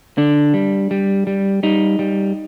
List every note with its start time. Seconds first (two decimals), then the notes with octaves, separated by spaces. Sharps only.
0.18 D3 D4
0.54 G3
0.91 G3
1.27 G3
1.63 G3 D#4
1.99 G3